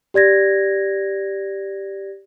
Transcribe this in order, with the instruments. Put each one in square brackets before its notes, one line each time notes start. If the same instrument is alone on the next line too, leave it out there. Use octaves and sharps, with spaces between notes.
[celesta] G4 D5 G#6 A#6